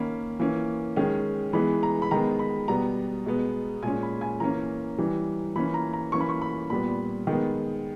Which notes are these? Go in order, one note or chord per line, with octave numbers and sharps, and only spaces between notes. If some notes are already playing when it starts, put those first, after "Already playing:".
Already playing: D#3 A#3 C#4 B5
E3 A#3 C#4
D#3 G#3 C#4
E3 G#3 B3 B5
A#5
B5
D#3 G#3 B3 A#5
B5
B2 G3 B3 A#5
B2 G#3 B3
A#2 G#3 C#4 G#5
B5
G#5
E3 A#3 C#4 A#5
E3 G3 C#4
E3 A#3 C#4 B5
A#5
A#5
E3 A#3 C#4 C#6
B5
C#6
B5
A#2 G3 B3 B5
D#3 G#3 B3